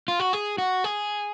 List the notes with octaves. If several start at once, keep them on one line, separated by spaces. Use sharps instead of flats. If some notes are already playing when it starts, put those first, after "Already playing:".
F4
F#4
G#4
F#4
G#4